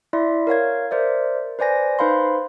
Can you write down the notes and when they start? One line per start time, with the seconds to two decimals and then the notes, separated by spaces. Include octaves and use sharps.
0.13 E4 D5 E5 C6
0.47 A#4 C#5 F5 G#6
0.91 A#4 C5 D5 E5
1.59 B4 C5 D5 G#5 A#6
1.99 D#4 B4 C5 F5 B5 C6